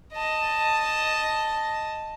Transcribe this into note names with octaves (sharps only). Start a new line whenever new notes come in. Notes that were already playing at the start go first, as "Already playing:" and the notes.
D#5 A5